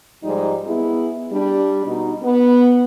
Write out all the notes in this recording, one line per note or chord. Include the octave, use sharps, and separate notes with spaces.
G#2 F3 G3 D#4
B3 E4 G#4
G3 D4
B2 D#4
B3